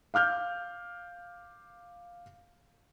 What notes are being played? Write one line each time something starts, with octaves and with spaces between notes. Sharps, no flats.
F5 D6 F6 G6